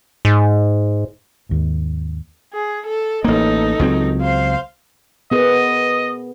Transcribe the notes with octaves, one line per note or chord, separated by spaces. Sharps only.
G#2
D#2 G#2
G#4
A4
A1 A#3 D#4 A4
C#2 F#3 C4
C5 F5
B3 G#4 A#4 D#5